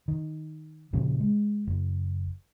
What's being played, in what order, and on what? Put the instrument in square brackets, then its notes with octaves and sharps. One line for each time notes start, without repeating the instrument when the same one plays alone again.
[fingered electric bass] D#3
A#2 C#3 F3
G#3
F#1